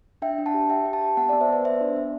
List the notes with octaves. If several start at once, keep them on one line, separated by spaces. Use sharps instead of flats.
D4 E5 G5
D4
F#5 A5
G4
G4 E5 G5
G4
F#5 A5
G4
B3 F#5 A5
D5 F#5
B3
C5 E5
B3 B4 D5
B3 C5 E5
D4
B3